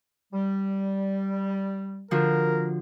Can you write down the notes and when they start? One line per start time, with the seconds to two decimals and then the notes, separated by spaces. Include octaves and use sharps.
0.33 G3
2.11 D3 F3 F#4 A#4